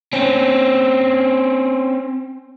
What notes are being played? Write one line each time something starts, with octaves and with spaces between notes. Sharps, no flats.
C4 C#4